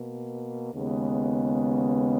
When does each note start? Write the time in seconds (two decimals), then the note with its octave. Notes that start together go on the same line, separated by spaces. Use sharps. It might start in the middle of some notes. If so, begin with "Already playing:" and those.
Already playing: B2 A#3
0.74 D#2 C#3 G#3 B3